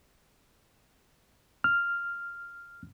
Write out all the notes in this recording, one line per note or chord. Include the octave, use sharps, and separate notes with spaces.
F6